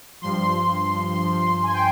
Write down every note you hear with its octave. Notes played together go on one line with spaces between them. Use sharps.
G2 F3 C6
G2 F3
G#5
G5